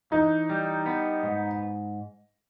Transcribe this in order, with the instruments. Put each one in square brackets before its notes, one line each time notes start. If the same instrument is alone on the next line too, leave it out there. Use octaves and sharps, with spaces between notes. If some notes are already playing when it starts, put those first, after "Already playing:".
[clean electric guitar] E3 [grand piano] D#4
[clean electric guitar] G3
B3
G#2